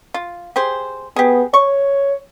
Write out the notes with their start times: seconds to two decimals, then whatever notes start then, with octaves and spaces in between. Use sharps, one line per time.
0.14 F4
0.56 G4 G#4 C5
1.16 B3 G4 G#4
1.54 C#5 C#6